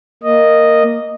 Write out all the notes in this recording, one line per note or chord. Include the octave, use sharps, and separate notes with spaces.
A#3 D#5